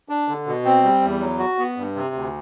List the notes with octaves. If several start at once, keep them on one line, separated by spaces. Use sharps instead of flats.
D4
D3
B2
C4
G3
E2
F#3
F#4
B3
G2
C3
D2